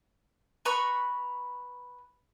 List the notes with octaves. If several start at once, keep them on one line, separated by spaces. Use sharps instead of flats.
B4 A#5 B5 C#6